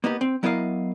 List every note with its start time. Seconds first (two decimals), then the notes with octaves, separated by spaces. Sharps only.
0.04 A#3 B3 D#4 G4
0.21 C4
0.43 F#3 B3 E4 A#4 D#5 F5